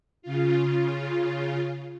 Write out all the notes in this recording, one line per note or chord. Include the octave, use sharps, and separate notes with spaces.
C#3 F4